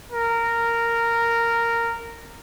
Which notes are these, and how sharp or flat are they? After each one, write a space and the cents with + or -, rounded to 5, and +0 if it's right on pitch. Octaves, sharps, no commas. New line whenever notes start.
A#4 -10